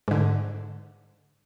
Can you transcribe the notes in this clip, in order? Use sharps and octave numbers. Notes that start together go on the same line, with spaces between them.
G#2 D3